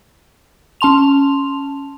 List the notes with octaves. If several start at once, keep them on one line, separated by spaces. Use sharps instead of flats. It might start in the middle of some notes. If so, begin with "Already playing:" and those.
C#4 A5 C6 F7